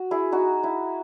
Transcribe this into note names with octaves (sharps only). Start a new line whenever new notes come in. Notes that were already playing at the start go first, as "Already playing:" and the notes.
Already playing: F#4
E4 G#4
D#4 F#4
E4